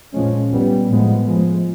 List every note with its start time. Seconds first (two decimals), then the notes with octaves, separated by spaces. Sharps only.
0.13 A#2 F3 G#3 C#4
0.50 A#2 G3 B3
0.89 A2 F3 G#3 B3
1.27 A2 F3 G#3